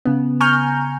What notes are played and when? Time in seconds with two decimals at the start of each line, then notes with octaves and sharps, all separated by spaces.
0.05 C#3 B3
0.40 G#5 A#5 C#6 F6 G6